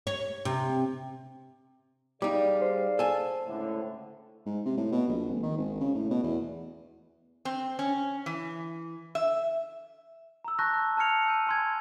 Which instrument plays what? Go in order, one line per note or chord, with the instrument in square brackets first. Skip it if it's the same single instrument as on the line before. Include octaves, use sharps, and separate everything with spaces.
[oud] C#5
C3
[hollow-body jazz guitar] G3 D#4 [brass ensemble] G#4 D5 F5 [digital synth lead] D6
[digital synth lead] C5
[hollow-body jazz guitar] A4 G#5
[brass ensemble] C#2 A2 D3
[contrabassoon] G#2
C3
A2
B2
A#1
G#1
D#3
G#1
C#3
A2
B2
E2
[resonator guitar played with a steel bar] C4
C#4
E3
E5
[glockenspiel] A#5 E6
A5 A#5 C#6 F#6 G6 A#6
F#6
A5 A#5 F6 G#6 C#7 F7
E6 G6 D#7
G#5 C6 G#6